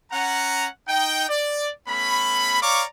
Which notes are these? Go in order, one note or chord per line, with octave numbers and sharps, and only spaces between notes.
C#4 F#5 A#5
D#4 G5
D5
A3 B3 C#4 B5
C#5 D5 F5 A#5 C#6 D6